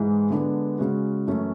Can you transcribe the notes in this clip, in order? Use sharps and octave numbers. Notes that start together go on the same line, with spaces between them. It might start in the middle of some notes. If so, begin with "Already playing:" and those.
Already playing: G#2 E3 G#3
D3 G#3 B3 D4
C#3 G#3 C#4 F#4
F#2 E3 A3 C#4